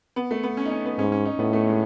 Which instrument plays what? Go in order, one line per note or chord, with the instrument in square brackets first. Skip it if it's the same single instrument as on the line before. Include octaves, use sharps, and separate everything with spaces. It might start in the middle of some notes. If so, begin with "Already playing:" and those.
[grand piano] B3
A3
B3
C#4
D#4
C#4
B3
[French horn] G#2 [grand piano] C#4
[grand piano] C#4
D#4
[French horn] A2 [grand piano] B3
[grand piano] A3
G#3